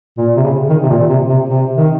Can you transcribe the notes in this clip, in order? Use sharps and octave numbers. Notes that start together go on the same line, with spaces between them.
A#2
C3
C#3
D#3
C3
A#2
C3
C3
C3
D#3